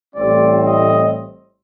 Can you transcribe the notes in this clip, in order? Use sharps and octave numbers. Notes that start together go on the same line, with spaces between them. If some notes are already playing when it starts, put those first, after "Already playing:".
A1 A2 G3 C4 D5
D#5